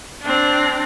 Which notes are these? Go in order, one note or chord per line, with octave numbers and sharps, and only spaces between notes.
C4 D4